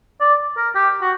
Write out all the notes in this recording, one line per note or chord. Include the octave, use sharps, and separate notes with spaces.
D5
A#4
G4
F#4